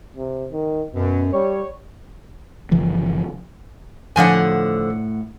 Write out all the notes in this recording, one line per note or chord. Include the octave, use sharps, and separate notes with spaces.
C3
D#3
F#2 B2
G3 C#5
G1 C#3 E3 F3
A2 D3 F3 F#5 G#5